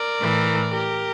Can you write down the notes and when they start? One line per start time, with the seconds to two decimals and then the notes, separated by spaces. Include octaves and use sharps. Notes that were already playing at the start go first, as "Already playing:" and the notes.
Already playing: A#4 D5
0.20 A2 E3
0.72 G4 A#4